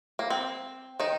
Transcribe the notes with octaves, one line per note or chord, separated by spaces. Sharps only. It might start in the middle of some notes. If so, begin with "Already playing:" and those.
A#3
C4
D#3 D#4